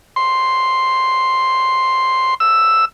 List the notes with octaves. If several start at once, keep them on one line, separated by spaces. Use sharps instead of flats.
C6
E6